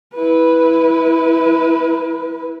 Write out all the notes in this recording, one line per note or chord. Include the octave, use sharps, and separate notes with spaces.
E4 B4